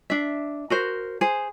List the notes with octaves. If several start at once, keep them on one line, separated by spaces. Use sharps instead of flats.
D4 E5
F#4 A#4 C5
G#4 C5